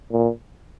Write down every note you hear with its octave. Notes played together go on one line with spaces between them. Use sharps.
A#2